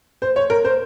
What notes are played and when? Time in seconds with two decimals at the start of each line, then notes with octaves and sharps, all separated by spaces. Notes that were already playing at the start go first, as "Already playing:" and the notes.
0.22 C5
0.36 C#5
0.50 A#4
0.65 C5